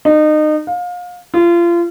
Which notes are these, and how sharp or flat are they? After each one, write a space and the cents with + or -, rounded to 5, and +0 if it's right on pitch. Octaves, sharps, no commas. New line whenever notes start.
D#4 -30
F5 +30
F4 -30